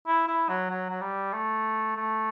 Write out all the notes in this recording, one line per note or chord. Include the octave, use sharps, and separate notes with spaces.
E4
E4
F#3
F#3
F#3
G3
A3
A3